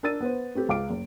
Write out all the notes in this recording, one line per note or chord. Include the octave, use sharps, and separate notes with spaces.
D4 A#4 E6 A6 D#7
B3 B4 C5
A3 C4 G4 B4
C#2 F5 D6 D7
F#1